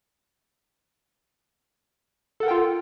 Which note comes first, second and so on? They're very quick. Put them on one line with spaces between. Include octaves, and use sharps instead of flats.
A4 F#5 A#4 G5 F4